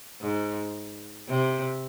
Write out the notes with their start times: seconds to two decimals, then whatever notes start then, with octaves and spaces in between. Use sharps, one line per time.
0.21 G#2
1.28 C3